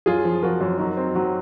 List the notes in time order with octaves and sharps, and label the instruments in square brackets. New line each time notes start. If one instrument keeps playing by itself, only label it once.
[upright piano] F#2 [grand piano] F4 G#4
[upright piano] F3
[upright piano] F3 [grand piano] F#4 A#4
[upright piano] F#2
[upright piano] F#3 [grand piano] D#4 F#4
[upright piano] C4
[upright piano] F#3 [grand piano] D#4 F#4